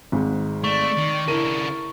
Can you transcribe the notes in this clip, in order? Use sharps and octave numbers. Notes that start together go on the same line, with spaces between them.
G#1 G#2
A3 D5 C#6
D#3
C#3 D4 E4 A#4 D#7